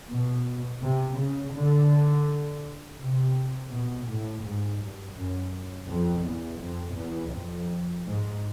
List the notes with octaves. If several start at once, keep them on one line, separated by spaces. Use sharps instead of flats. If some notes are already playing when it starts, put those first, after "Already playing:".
B2
C3
C#3
D3
C3
B2
A2
G#2
G2
F#2
F2
E2
F2
E2
F2
G#2